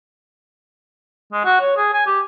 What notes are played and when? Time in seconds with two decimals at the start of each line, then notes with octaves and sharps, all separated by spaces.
1.32 G#3
1.45 F#4
1.60 C#5
1.77 G#4
1.94 G#5
2.06 G4